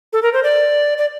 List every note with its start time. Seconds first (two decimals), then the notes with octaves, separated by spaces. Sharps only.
0.13 A4
0.23 A#4
0.33 C5
0.43 D5
0.98 D5